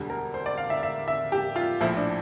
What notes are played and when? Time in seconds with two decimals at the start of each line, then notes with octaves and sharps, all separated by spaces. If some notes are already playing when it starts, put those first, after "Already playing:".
Already playing: E1 D2 D3 G3
0.10 A#4
0.34 C5
0.46 D5
0.58 F5
0.70 E5
0.83 E5
1.08 E5
1.32 G4
1.56 F4
1.80 A#1 A2 F3 E4
1.97 D4